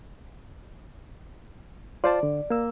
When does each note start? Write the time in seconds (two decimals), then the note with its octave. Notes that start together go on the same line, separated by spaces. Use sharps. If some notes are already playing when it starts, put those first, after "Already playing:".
2.04 F4 C5 D5 A5
2.23 D3
2.50 A#3 E6